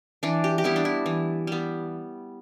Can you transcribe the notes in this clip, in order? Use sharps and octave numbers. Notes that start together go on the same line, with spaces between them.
E3 D4
G4
G4
G3 B3 E4
D4
E4
E3
G3 B3